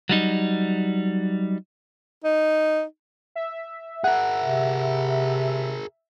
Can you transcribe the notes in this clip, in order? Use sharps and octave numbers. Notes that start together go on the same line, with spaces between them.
F#3 G3 D#4
D#4
E5
G#4 A#4 F#5
C3